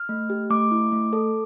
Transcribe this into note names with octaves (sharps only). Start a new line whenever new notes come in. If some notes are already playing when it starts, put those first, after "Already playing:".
Already playing: F6
A3
G4
A3 D6
E4
A3
A4